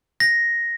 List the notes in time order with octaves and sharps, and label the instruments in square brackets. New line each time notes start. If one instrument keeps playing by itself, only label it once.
[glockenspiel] A#6